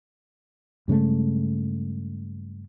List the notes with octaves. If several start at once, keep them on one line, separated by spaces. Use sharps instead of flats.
G2 C#3 G#3 A3